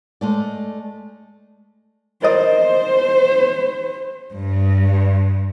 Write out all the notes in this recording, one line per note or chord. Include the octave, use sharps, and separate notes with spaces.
G#3 A3 D5
A#4 C5 D5 D#5
G2